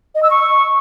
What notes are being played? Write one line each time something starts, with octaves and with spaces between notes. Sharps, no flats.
D#5
E6
C#6